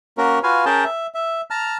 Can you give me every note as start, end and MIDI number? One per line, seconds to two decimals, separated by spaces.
0.18 0.39 58
0.18 0.39 61
0.18 0.39 66
0.18 0.39 70
0.43 0.65 65
0.43 0.65 66
0.43 0.65 71
0.43 0.65 77
0.43 0.65 80
0.65 0.85 61
0.65 0.85 68
0.65 0.85 70
0.65 0.85 79
0.65 0.85 81
0.85 1.07 76
1.14 1.41 76
1.50 1.78 81
1.50 1.78 82
1.50 1.78 89